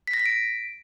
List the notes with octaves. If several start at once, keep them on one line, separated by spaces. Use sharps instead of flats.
B6
A#6
B6
D7